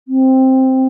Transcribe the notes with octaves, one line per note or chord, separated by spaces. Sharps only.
C4